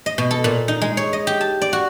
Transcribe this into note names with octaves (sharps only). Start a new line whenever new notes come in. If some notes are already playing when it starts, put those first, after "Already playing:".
D#5
B2
A4
A#2
D#4
G#3
C#5
D#5
G4
A5
D5
F#4